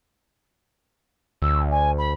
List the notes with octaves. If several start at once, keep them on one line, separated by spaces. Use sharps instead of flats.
D2 E6
G#5
B5